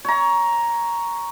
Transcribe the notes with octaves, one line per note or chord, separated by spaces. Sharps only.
C#5 A#5